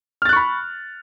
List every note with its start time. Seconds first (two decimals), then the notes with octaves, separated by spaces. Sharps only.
0.22 F6
0.25 A6
0.29 F#6
0.33 C#6
0.36 B5